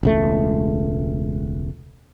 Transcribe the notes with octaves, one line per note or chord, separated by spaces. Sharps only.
E1 C#2 A3